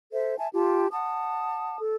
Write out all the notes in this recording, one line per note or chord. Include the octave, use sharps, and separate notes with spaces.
A4 C5 E5
E5 G#5 A5
F4 G4 A5
F#5 A5 D#6
A4